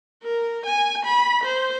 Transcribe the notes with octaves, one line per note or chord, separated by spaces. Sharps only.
A#4
G#5
B5
C5